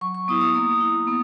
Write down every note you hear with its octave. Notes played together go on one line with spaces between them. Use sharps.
F#3 C#6
C#6
B3 E4 D#6
D#6
A#3 D#6
E4
B3